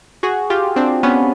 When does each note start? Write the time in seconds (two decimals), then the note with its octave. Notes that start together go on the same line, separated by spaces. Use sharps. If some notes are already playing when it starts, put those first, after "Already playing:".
0.23 F#4 G#4
0.50 F4 G4
0.76 C4 D4
1.03 B3 C#4